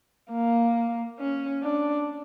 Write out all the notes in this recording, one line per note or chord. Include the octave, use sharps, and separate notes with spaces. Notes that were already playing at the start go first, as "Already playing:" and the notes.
A#3
C#4
D4